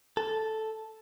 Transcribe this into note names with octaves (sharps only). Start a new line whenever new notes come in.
A4